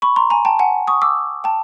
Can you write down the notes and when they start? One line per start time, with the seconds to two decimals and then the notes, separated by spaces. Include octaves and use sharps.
0.02 B5 C#6
0.16 A#5 C6
0.30 G#5 A#5
0.45 G5 A5
0.59 F#5 G#5
0.87 C#6 D#6
1.02 D6 E6
1.44 G5 A5